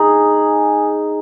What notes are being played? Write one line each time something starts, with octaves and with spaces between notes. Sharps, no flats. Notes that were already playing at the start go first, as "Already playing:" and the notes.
Already playing: D#4 G#4